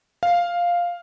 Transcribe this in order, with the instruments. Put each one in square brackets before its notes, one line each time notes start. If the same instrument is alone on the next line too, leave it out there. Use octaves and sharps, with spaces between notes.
[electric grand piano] F5